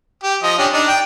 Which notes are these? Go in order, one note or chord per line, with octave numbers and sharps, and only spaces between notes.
G4
F3 D#5
C#4 D4 G4
D4 D#4
G5